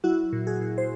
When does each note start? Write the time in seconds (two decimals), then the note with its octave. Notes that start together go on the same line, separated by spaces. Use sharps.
0.04 F#3 E4 F#4
0.33 A#2
0.47 F#4 G#4
0.61 A#2
0.78 C5